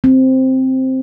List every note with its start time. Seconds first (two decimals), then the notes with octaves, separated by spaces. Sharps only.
0.04 C4